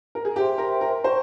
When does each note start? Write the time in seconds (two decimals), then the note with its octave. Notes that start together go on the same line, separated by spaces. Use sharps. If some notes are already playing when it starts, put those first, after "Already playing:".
0.15 A#4
0.25 G#4
0.36 G4 C5 E5 G5 C6
0.58 A#4
0.81 A#4
1.04 C5 G5 A#5 C#6